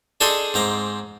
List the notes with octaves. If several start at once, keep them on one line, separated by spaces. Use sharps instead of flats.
D4 G#4 A4 D#5 G5 C6
G#2 C4 A#5 D6